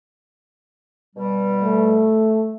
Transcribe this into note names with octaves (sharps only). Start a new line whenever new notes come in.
B2 G3
A3